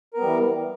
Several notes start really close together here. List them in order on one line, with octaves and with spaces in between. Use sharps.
A#4 B3 G3 E3